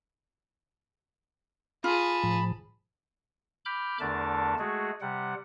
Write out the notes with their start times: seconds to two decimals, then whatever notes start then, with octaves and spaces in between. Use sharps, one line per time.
1.84 F4 G#4 A5 B5
2.24 A2 F3
3.65 B5 D6 F6 G6
4.00 E2 D3 A3 D4 A#4 A5
4.59 G#3 A3 F#4 G#4
5.01 C3 G3 F#5